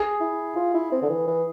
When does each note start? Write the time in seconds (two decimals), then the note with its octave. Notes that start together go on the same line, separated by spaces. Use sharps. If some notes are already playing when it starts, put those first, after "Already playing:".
Already playing: G#4
0.20 E4
0.56 F4
0.74 E4
0.92 C4
1.02 D3
1.09 E3
1.28 E3